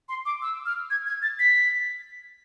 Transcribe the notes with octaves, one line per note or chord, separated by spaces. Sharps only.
C6
D6
E6
F6
G#6
G#6
A6
B6